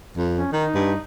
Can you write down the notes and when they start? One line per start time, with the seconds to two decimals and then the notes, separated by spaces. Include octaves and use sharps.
0.17 F2
0.38 C#4
0.52 D#3 D#4
0.74 G2